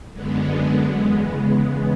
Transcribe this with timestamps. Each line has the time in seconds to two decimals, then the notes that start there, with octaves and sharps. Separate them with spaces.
0.11 F#2 D3 G#3 B3
0.93 E2 C#3 G#3 B3